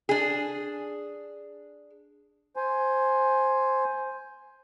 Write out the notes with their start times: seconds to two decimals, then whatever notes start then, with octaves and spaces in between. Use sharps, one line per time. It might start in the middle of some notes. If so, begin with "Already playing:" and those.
0.09 D4 G#4
2.56 C5 G#5